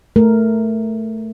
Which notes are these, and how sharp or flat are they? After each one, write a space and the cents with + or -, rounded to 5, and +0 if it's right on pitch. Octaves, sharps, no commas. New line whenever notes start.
A3 +0 A#4 +0